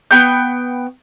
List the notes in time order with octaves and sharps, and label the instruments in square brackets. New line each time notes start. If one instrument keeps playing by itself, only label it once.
[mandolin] B3 G5 C#6 G6